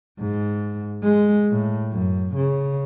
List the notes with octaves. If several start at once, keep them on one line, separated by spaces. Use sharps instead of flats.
G#2
G#3
A2
F#2
C#3